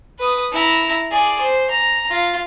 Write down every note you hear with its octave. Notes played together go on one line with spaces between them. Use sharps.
B4 D#6
E4 A#5
G#4 D5
C5
A#5
F4